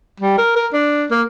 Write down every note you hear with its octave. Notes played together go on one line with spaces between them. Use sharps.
G3
A#4
A#4
D4
A#3